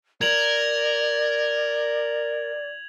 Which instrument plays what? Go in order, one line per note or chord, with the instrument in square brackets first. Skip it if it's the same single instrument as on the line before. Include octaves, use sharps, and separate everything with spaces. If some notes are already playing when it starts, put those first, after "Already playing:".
[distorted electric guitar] A#4 [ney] D5 [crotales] G#6 F7 F#7